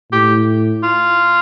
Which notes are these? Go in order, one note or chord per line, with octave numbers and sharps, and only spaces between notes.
A2 G4
F4